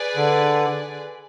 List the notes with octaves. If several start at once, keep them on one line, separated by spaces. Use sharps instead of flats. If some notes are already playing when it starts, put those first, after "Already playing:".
Already playing: G#4 B4 D5
D3